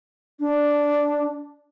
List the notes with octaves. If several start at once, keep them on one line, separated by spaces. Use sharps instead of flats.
D4